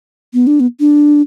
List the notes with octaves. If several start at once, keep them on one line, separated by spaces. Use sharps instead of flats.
B3
D4
B3
D4